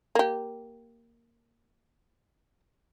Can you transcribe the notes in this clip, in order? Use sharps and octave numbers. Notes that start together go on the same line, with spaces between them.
A#3 G4